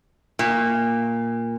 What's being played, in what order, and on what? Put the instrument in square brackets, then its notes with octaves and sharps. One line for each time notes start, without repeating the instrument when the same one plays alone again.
[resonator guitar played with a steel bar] A#2